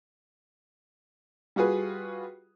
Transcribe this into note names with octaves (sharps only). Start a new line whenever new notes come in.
G3 F4 F#4 G#4 B4